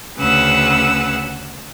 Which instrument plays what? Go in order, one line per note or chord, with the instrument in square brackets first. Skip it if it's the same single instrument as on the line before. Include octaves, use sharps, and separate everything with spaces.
[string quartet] D2 C#3 G#4 B4 F#5 E6